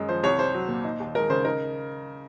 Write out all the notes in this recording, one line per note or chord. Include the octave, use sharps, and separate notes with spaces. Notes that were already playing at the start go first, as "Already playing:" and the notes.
Already playing: F#2 G#3
F3 C5
C2 C#5
C2 C5
F#3
A#2
D#4
D#2
G#3 A#4
C#3 C5
D#4 A#4